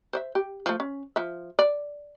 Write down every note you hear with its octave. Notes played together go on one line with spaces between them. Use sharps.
C5 D5 E5
G4
F3 A3
C#4
F3 E5
D5